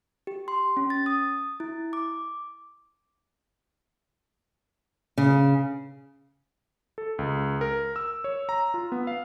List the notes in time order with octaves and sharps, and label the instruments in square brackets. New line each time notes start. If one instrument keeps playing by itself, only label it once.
[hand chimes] G4
C6
C#4
A6
D#6
E4
D6
[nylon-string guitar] C#3
[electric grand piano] A4
C#2
A#4
E6
C#5
A#5
F4
B3
F5